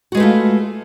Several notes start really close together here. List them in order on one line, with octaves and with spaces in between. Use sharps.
F#4 G#3 B4 A3 F4